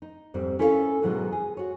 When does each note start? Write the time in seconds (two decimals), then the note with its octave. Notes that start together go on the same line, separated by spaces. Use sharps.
0.02 D#4
0.34 F2 G#2 G3 C4
0.59 C#4 E4 A4 A#4 C5 F5
1.02 G#2 B2 D#3 F#3 G#3
1.32 G#4
1.57 F#4 C#5